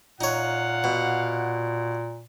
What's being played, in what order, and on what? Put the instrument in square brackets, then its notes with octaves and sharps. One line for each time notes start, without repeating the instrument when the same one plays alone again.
[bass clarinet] A#2 [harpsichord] D#4 C#5 [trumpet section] F5 F#5
[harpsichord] B2